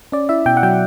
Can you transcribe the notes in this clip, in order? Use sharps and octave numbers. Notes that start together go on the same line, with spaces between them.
C#4 D5
E4 E5
B2 G5
F#5
F#3 G5